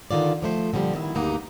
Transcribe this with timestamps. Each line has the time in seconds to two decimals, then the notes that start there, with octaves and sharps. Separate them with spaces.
0.11 D3 D#3 F4 D5
0.42 F3 A3 C5
0.73 A#2 D3 F3 G3
0.94 B2 D#3 E4
1.15 D2 G2 A#3 D#4 G4 F#5